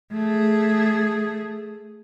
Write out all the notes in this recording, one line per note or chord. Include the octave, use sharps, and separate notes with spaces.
A3 G#4